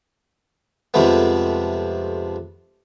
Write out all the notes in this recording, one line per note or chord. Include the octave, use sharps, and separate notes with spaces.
F2 C3 F3 G#3 A3 B3